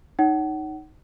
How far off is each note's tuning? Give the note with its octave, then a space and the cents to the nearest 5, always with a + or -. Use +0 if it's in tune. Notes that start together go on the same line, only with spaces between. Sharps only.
D#4 +0 C#5 +20 F#5 +30